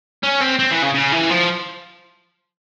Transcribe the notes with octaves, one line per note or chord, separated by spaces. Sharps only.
C#4
C4
C4
E3
C#3
C#3
E3
F3